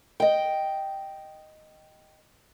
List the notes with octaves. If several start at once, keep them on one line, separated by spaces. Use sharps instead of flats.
D#5 G5